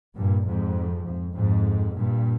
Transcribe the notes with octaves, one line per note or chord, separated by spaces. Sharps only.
G2 A#2
F2 G#2
F2
F2 G#2
G2 A#2